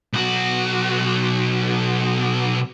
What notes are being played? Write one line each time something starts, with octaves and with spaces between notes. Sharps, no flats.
B1 F#4